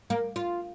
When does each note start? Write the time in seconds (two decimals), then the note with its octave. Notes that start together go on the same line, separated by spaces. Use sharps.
0.10 A#3
0.36 F4